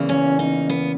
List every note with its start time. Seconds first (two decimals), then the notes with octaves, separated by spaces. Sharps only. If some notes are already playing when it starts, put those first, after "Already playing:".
Already playing: E2 C#3 E3 A#3
0.09 C#4
0.39 D#4
0.70 B3